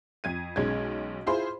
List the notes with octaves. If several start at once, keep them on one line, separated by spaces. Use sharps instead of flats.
F2 G#6 D#7
B1 G#3 C#4 G#6
E4 F4 G#4 C5 B5 C6